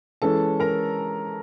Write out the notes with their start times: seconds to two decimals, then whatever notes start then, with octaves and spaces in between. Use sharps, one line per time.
0.22 E3 G#3 C#4 A4 A5
0.60 A#4 A#5